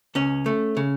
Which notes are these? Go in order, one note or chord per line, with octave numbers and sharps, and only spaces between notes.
C#2 C#4
A3
C#3